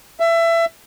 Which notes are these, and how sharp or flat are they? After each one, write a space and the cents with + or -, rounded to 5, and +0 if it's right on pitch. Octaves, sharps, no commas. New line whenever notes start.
E5 +25